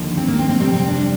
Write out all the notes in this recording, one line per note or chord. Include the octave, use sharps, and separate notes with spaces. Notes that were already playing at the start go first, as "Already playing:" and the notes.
Already playing: D#2 D3 F3
C4
A#3
C4
C4
F2 C3 G3 C4
C4
D4